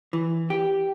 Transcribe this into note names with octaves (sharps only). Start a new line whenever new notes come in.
E3
G4